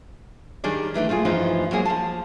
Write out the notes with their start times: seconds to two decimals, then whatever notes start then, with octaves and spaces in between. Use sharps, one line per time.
0.64 D#3 G3 D4 G#4 D5
0.94 D#3 E3 A3 D4
1.09 A#2 A3 F4 G#4
1.25 G2 E3 F3 D#4
1.71 F#3 G#3 A#3 G#4
1.85 F3 A5